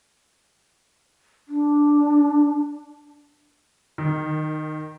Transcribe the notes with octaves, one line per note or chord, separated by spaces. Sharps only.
D4
D#3